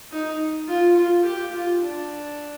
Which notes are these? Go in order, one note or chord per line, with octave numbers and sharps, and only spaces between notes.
D#4
F4
F4
G4
F4
D4